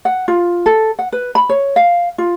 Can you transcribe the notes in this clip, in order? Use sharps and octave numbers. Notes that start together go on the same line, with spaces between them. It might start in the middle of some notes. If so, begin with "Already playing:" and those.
F#5
F4
A4
F#5
B4
B5
C#5
F5
F4